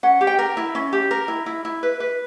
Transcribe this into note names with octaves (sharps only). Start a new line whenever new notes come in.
C#4 F#5
G4
G5
A#4
E4
C#4
G4
A#4
E4
E4
E4
B4
B4